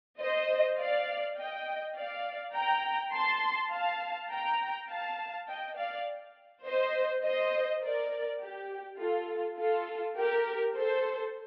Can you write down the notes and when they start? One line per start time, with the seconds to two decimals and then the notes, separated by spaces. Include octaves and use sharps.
0.20 C5 D#5
0.79 D5 F5
1.38 D#5 G5
1.96 D5 F5
2.55 G5 A#5
3.13 A5 C6
3.72 F5 A5
4.31 G5 A#5
4.90 F5 A5
5.48 D#5 G5
5.77 D5 F5
6.65 C5 D#5
7.24 C5 D#5
7.83 A#4 D5
8.41 G4
9.00 F4 A4
9.58 F4 A4
10.16 G4 A#4
10.75 A4 C5